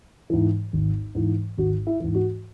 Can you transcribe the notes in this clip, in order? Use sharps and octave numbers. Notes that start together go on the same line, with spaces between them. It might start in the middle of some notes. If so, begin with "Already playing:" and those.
G#2 E3
G#1
G#2 E3
G#1 F#4
E4
G#2 E3
F#4